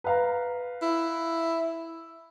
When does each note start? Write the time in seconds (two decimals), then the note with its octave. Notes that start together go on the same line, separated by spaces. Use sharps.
0.04 B4 F5 A#5
0.82 E4